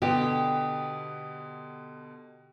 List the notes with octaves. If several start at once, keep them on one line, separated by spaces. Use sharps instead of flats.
B2 D3 B3 G4